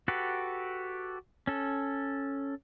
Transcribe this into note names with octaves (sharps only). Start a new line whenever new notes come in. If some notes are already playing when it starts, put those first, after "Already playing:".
F#4 G4 A4 B4
C#4 A4